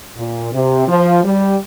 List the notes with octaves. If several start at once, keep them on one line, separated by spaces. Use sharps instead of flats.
A#2
C3
F3
G3